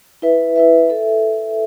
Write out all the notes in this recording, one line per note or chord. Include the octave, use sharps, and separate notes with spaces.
E4 B4 E5
E4 B4 E5
A4 E5